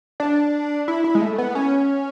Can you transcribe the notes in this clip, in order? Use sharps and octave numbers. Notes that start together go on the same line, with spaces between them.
D4
E4
E4
G#3
A3
B3
C#4